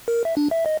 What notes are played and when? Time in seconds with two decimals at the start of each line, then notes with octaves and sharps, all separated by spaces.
0.08 A#4
0.25 E5
0.37 D4
0.51 E5
0.66 D#5